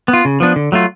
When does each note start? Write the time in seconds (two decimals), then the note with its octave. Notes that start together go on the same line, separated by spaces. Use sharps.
0.08 B3
0.13 F4
0.25 C#3
0.40 F3 B3 D4
0.56 D3
0.72 F#3 A3 F4